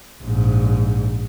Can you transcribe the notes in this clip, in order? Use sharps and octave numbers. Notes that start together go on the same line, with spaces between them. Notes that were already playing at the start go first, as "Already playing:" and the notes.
A#1 G#2